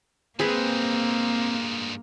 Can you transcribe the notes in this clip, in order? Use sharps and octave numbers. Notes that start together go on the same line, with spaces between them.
G2 G#3 A#3 C4 G#4 B4